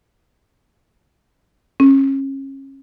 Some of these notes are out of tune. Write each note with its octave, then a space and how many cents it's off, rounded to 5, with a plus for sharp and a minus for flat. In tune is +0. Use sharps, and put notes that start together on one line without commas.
C#4 -30